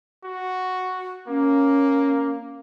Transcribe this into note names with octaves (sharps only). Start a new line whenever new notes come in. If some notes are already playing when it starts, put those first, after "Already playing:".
F#4
A#3 C#4